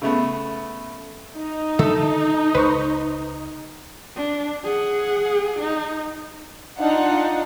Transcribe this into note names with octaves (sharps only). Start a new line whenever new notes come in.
C#3 A3 B3
D#4
D3 D#3 D4 A4 E5
C#2 B4 C5 C#6
D4
G#4 F#5
D#4
D4 D#4 F4 F#5